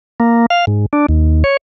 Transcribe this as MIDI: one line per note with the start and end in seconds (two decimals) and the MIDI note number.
0.20 0.46 58
0.50 0.65 77
0.67 0.86 44
0.93 1.06 62
1.09 1.44 39
1.44 1.57 73